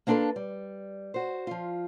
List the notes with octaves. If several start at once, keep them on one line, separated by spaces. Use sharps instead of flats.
A#3 B3 D4 F4 A4 B4
G3
F#4 C5
F3 F4